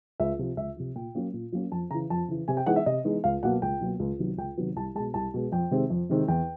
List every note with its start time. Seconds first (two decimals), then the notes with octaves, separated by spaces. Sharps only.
0.20 C#2 E5
0.39 C3 F3
0.57 C#2 E5
0.76 C3 F3
0.96 A#2 G5
1.15 F#3 A#3 C#4
1.33 A#2
1.52 F#3 A#3 C#4
1.72 F2 A5
1.91 C#3 A#5
1.94 E3
2.10 F2 A5
2.28 C#3 E3
2.48 C3 G#5
2.57 G5
2.66 E3 G#3 B3 D#4 F#5
2.76 E5
2.86 C3 D#5
3.04 E3 G#3 B3 D#4
3.24 C#2 F5
3.43 B2 F#3 A#3 F#5
3.62 C#2 G5
3.80 B2 F#3 A#3
4.00 C#2
4.19 C3 D#3 F#3 B3
4.38 C#2 G5
4.57 C3 D#3 F#3 B3
4.76 C2 A5
4.95 G#3 A5
5.00 B2
5.14 C2 A5
5.34 B2 G#3
5.52 F2 G5
5.71 C3 D#3 G#3 C4
5.90 F2
6.09 C3 D#3 G#3 C4
6.28 E2 G5